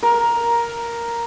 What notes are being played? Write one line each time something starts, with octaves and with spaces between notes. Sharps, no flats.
A#4